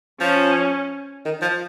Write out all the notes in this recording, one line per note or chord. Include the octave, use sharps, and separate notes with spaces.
F3 C#4
D#3
F3